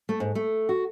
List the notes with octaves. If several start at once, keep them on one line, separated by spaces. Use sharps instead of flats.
A3
G#2
A3
F#4